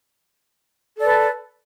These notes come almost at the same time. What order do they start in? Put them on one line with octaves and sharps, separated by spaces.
A4 D5 B4 A5